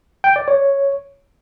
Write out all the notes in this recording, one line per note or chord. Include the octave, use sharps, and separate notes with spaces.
G5
D5
C#5